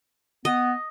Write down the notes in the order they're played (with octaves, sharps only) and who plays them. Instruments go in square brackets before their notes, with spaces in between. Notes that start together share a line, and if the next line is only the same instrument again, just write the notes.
[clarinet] B3 [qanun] D#5